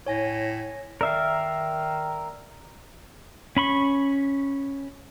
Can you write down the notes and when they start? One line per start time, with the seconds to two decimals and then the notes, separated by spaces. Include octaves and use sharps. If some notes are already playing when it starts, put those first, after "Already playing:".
0.06 A2 C#5 G#5 A#6
1.01 D#3 A#4 D5 E5 F5
3.57 C#4 B5 C#6